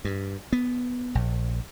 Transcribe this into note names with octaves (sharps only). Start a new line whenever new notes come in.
G2
B3
A#1